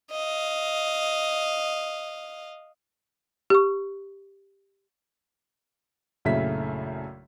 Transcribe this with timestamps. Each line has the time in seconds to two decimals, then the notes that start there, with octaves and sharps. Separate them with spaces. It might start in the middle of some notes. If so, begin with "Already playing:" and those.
0.11 D#5 F5
3.50 G4 C#6
6.25 A#1 F#2 C#3 A3 E4 B6